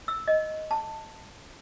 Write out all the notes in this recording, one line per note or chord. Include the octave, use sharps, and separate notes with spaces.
E6
D#5
A5